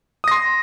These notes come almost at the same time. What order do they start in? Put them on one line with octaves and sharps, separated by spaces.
D#6 A#6 C6